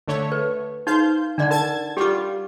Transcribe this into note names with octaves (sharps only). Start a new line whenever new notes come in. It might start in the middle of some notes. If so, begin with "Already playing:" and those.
D3 A3 C#5
B4
D#4 C5 F5 G6
D3 D4 D5 F#5
A#4 A5 G#6 A6
G3 F4 G4 D6